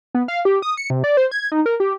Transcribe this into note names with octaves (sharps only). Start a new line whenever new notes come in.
B3
F5
G4
D#6
C#7
C3
D5
C5
G#6
D#4
A#4
G4